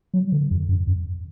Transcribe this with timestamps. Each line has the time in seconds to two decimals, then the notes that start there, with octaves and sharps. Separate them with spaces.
0.14 F#3
0.32 D3
0.51 F2
0.69 F#2
0.87 F2